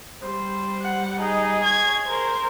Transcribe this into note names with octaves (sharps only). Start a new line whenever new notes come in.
G3 C5
F#5
D#4 G#4
C#5 G#6
A#4 C5